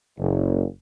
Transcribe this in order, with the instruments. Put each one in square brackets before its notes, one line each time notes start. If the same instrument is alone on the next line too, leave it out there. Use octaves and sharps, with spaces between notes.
[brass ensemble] F#1